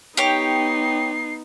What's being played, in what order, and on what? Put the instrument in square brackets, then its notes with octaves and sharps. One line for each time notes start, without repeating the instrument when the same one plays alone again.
[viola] B3 D#4 [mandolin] G4 C#5 [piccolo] C7